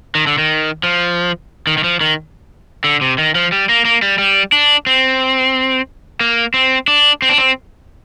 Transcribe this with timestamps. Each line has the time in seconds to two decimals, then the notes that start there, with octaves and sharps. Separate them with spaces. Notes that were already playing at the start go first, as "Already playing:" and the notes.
0.15 D#3
0.27 D3
0.38 D#3
0.83 F3
1.67 D#3
1.78 D#3
1.84 F3
2.01 D#3
2.84 D3
3.01 C3
3.18 D#3
3.35 F3
3.52 G3
3.69 A#3
3.85 A#3
4.02 G3
4.18 G3
4.52 D4
4.87 C4
6.21 A#3
6.54 C4
6.88 D4
7.22 C4
7.29 D4
7.38 C4